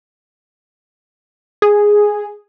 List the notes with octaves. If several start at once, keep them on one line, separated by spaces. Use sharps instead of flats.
G#4